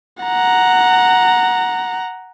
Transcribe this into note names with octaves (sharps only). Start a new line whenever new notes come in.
F#5 A#5